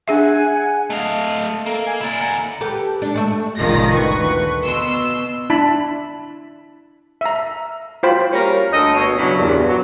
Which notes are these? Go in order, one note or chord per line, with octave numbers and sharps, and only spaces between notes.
D4 G#4 E5 F#5 G#5
A3 D#5 F5
A#3 A4
G#5
E4 D5
D#2 F#5 A#5
G4 A4 B4
D4
A3 E5
G1 C#2 A#2 D#3 F3 A#6
D2 B4 C#6
B2 C6 E6
D4 E4 A5 B5
E5 A#5
F4 F#4 C5 G5 B5
G3 A#3 C#4 A#4
D2 A4 D#5
B2 C#5
G2 C#3 F#3 G3 C#4 E4
E2 G2 A#2
F#3